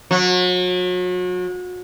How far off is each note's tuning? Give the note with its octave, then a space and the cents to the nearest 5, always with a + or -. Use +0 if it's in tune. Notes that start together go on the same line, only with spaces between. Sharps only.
F#3 -35